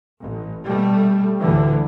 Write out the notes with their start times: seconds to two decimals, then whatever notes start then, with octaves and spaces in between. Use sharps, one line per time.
0.20 A1
0.66 B2 G3 A3
1.40 D2 A2 D3 E3